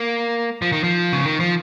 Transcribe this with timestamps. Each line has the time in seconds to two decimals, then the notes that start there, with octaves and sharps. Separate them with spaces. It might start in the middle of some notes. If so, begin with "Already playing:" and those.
Already playing: A#3
0.62 F3
0.72 D#3
0.84 F3
1.13 C#3
1.25 D#3
1.40 F3